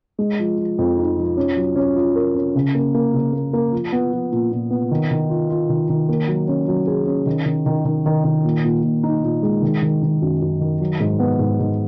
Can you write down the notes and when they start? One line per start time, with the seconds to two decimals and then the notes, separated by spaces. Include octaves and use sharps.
0.19 G#3
0.39 F3
0.58 F3
0.78 F2
0.98 D#4
1.18 F3
1.37 C#4
1.56 F#3
1.76 C#4
1.96 F4
2.15 A#4
2.35 C#4
2.55 C#3
2.75 A#3
2.94 A#3
3.14 C#3
3.33 A#3
3.53 A#3
3.72 F3
3.93 B3
4.13 F3
4.32 A#2
4.52 A#2
4.70 B3
4.91 D#3
5.11 D#3
5.29 F4
5.50 F4
5.69 D#3
5.89 D#3
6.09 A#3
6.28 F#3
6.48 C#4
6.68 F#3
6.87 G#4
7.07 C#4
7.26 D#3
7.46 D#3
7.66 D#3
7.85 D#3
8.06 D#3
8.24 D#3
8.44 A#2
8.64 A#2
8.83 A#2
9.03 D#4
9.24 A#2
9.43 G#3
9.62 D#3
9.82 D#3
10.02 D#3
10.22 F#2
10.42 F#2
10.61 D#3
10.80 F#3
11.00 G#2
11.19 B3
11.39 G#2
11.59 G#2